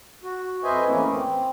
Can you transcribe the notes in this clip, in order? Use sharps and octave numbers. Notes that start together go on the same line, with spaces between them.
F#4
F2 B4 C5 D#5 E5 G#5
A2 E3 A3 A#3 C#4 E4
C4